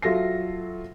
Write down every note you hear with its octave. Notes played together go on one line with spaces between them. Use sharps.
F#3 F4 A4 E5 A#6 C7